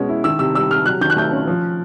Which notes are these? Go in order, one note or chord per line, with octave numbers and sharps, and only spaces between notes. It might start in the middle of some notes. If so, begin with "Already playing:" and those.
Already playing: B2 G#3 C#4
E4
D#3 E6
C3 E6
G3 E6
C3 F6
F#3 F#6
D#3 G6
F#6
A3 G6
C#4
F3